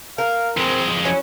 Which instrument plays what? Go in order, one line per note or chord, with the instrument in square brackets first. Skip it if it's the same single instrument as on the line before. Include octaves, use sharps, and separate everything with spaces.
[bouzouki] A#4 [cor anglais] F5
[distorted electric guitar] F2 G#3 [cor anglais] C4
[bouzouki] F#3 C#4 E4 [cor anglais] G#5